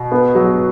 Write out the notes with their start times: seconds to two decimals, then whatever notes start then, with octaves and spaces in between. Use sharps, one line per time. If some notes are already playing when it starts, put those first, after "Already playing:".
Already playing: B2
0.12 B3
0.35 F#3